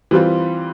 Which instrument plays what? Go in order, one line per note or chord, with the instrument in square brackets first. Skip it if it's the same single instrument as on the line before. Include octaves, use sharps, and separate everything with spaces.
[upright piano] E3 G3 C4 F4